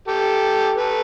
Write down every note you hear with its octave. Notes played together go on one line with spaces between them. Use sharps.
G4 A4
A4 B4